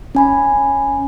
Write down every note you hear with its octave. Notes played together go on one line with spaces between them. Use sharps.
C#4 G#5 B5